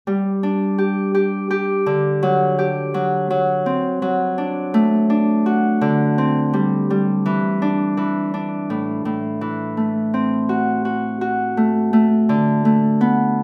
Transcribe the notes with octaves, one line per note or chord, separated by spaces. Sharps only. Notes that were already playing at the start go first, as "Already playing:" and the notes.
G3
D4
G4
G4
G4
D3
F#3
G4
F#3
F#3
C4
F#3
D4
A3
D4
F#4
D3
C4
G3
G3
E3
D4
E3
D4
A2
A2
E3
A3
C4
F#4
F#4
F#4
A3
A3
D3
A3
B3